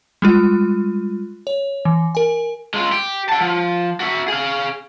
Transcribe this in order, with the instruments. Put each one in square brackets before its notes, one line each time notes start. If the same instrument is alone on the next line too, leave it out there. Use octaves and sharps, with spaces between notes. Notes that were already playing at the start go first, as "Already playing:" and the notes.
[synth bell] G3 G#3 F4
C#5
E3
A#4 G#5
[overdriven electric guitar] G#3 F4
G4
F#5 A5
F3
F#4 E5
G#4 F5